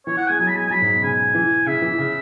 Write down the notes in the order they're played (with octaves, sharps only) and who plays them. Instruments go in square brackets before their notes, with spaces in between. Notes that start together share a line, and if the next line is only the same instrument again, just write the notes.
[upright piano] E3 [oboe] C#5
[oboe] F#5
[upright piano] G#3 [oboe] G#5
[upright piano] F#3 [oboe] G#5
[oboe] B5
[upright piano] G#3 [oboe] G#5
[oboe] G#5
[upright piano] F#3 [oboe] B5
[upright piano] G#2
B2
[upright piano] C#3 [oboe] G#5
[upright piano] E3
[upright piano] C#3 [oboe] E5
[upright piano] E3
C#3